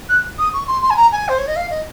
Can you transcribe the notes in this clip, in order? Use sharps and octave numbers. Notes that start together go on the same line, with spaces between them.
F#6
D#6
C#6
C6
C6
G#5
A#5
G#5
C5
C#5
D#5
F5
D#5